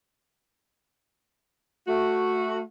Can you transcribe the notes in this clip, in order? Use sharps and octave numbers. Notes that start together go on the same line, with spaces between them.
A3 F#4